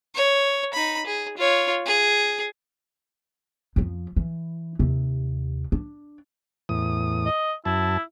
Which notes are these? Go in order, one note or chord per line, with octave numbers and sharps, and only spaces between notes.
C#5
D#4 B5
G#4
F4 C#5
G#4
F2 F3
E3
D#2 C3
D4
E2 A2 D#6
D#5
F#2 E4 A5